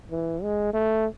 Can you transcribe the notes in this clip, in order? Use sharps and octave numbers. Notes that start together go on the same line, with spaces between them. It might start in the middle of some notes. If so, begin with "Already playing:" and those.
E3
G#3
A3